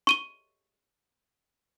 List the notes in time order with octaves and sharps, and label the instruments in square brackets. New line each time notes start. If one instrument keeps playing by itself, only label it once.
[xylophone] C#6 D#7 G7